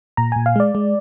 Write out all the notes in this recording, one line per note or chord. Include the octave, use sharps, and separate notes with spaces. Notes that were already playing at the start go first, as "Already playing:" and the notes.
A#2 A#5
A#2 G#5
F5
G#3 D5
G#3